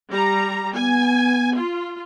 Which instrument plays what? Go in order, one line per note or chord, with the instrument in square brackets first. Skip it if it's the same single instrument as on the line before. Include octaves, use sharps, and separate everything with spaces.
[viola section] G3 A#5
[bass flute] B3 [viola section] G#5
[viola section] F4